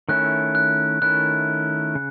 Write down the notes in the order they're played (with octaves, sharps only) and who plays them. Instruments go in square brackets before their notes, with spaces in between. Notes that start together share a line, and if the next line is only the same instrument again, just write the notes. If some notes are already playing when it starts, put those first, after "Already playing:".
[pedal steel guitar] D#3 A3 C#4 E4 [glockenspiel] F#6
[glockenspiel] F#6
[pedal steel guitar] D#3 A3 C#4 E4 [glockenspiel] F#6
[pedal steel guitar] C#3